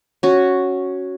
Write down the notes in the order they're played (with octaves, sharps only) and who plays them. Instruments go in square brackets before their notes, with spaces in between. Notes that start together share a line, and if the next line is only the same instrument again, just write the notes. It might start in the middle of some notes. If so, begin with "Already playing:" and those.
[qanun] C#4 F#4